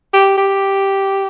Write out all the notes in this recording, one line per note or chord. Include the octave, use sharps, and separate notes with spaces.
G4
G4